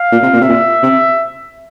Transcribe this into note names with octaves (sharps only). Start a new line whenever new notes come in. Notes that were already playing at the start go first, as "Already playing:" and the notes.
Already playing: F5
A#2
C3
A#2
C3 E5
A#2
C3